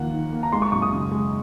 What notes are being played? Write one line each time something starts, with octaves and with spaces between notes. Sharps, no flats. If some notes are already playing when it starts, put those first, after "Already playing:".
Already playing: D#2 F3 A#3 F#5
D#3
A#3
A#5
G#3 C6
C#6
F#2 C#6
D#6
C#3
G#3